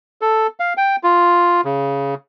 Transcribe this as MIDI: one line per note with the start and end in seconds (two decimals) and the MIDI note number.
0.21 0.47 69
0.60 0.73 77
0.77 0.96 79
1.03 1.61 65
1.65 2.15 49